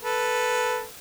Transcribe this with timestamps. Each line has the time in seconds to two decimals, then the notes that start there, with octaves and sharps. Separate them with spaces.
0.03 A4 B4